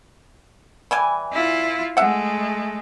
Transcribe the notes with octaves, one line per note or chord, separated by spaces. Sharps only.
E3 G3 G#5
E4 F4
G#3 A3 E5 F#5